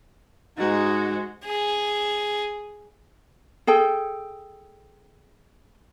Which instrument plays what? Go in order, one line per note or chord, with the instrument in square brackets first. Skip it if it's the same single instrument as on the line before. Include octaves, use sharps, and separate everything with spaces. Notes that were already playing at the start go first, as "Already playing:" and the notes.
[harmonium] G#2 D#4 [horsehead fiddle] G#3 F#4
[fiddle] G#4
[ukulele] G#4 A4 G5